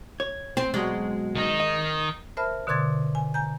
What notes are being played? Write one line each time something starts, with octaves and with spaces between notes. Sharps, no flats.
C#5
C4 C5
B2 F#3 G#3 D5
D#3 D#4
D#5
A#4 C5 E5 A5 B5 F6
B2 D3 C6 D6 G#6 A6
G#5
G#5 A#5 G6